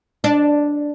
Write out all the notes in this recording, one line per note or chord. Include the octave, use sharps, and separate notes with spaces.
D4